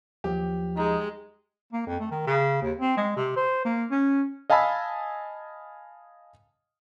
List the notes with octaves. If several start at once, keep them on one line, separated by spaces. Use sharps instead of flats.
D#2 F3 F#3 G4
G#3 D#4
A#3
F2
A3
D#3
C#3
D#2
C4
G#3
C3
C5
A#3
C#4
D#5 F5 G#5 A5 B5 E6